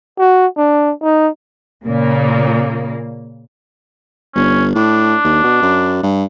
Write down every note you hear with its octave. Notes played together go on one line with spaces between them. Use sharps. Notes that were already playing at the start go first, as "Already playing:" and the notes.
F#4
D4
D#4
A#2 C#3 A#3
G1 C#4
A2 D4
D#2
B2
F#2
G2